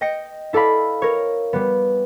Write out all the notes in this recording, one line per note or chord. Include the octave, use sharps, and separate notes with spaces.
D#5 G5 A#6 C#7
E4 A4 D5 F5 B5
A#4 C#5
G3 B3